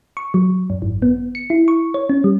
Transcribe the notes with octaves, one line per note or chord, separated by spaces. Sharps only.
C#6
F#3
F#2
G#1
B3
C#7
E4
C#6
C#5
C#4
G3